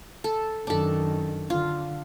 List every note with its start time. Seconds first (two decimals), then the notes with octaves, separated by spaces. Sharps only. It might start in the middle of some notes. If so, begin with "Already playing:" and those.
0.24 A4
0.67 F#2 D#3 D4 A4
1.50 D3 F4